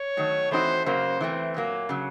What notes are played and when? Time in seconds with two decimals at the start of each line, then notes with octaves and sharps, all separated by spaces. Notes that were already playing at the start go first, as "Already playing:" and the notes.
Already playing: C#5
0.17 D#3 F#3 A3
0.51 E3 A3 C4 D#4 F#4 C5
0.86 F#2 C#3 F#3 A#3 C5
1.20 E3 A3 C4
1.54 A#2 F#3 A#3
1.89 C#3 F#3